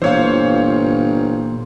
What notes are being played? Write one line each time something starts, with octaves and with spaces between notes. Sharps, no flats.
G1 A#2 E3 C5 C#5 F5